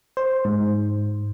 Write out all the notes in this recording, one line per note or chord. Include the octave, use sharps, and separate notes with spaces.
C5
G#2